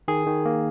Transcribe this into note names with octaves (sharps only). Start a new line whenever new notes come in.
D#3 G#4
D#3
A#3